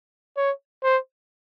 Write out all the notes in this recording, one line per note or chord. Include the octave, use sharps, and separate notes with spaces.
C#5
C5